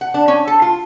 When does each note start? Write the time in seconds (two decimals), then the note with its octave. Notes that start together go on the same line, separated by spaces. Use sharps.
0.01 F#5
0.14 D4
0.28 C#4
0.47 A4
0.62 F4